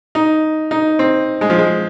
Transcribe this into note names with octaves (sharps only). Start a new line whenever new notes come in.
D#4
D#4
C4
G#3
F3
G#3